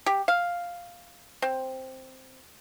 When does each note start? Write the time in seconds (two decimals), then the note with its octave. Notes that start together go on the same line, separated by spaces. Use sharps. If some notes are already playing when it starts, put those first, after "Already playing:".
0.06 G4
0.28 F5
1.42 C4